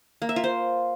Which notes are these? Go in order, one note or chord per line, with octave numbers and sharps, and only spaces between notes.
A#3
E5
F4
C5